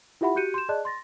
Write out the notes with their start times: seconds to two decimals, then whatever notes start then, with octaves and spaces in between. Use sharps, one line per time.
0.21 E4 F4 G4 E5 F#5 B5
0.35 F#4 G4 F#6 G6 C#7 D#7
0.54 C6 G6 E7
0.69 G#4 D5 D#5 A5 F#6
0.85 C6 A6 A#6